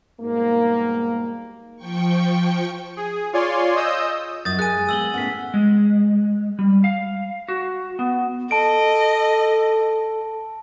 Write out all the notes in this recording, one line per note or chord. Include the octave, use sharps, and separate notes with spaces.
G#2 B2 G3 A#3
F3 G5 C#6
G#4
F4 C#5 D5 G#5 C6
D#5 D#6 E6 G6
F#2 D#6 G6 A6
G#4 A#4 G#5 F#6 D#7
G#3
G#3 B3 E6 F#7 G7
A2 B3 C#4 F#5 B6
G#3
G3
F5
F#4
B3
A4 D#5 A5 D7